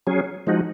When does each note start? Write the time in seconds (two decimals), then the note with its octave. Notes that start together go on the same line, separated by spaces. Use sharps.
0.07 F#3 C#4 G#4
0.47 F3 G#3 D#4 F#4